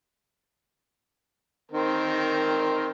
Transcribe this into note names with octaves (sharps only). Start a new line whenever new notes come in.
D#3 C4 A#4